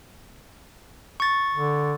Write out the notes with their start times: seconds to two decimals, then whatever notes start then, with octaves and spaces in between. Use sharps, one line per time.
1.20 C#6 A6
1.54 D3